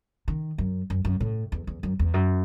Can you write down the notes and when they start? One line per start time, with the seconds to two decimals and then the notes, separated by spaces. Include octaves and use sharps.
0.28 D#3
0.58 F#2
0.90 F#2
1.05 F#2
1.20 A2
1.52 E2
1.67 E2
1.83 F#2
1.99 E2
2.14 F#2